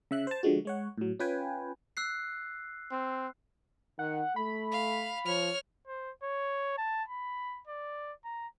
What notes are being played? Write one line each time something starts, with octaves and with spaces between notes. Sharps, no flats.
C#3 E5 F#6
C5 A5
D3 F3 G#3 F#4
G#3 C#5 F#5
A2 F#3
C#4 F4 B4 G5 G#5
E6 F#6 C7
C4
D#3 F#5
A3 B5
F5
F3 C#5 F6
C5
C#5
A5
B5
D5
A#5